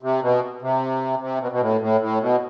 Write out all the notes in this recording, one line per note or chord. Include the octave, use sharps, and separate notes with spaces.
C3
B2
C3
C3
B2
B2
A2
A2
A2
B2